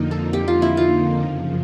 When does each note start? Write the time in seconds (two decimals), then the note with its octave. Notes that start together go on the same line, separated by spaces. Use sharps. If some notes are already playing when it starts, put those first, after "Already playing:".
Already playing: F2 D3 F3 A#3 D#4
0.11 A4
0.33 G4
0.48 F4
0.62 E4
0.77 F4
1.21 F#2 C#3 F3